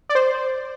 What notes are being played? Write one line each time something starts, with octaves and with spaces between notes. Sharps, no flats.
D5
C5